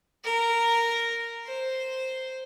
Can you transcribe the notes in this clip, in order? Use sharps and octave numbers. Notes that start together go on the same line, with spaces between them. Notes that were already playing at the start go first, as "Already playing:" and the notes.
A#4
C5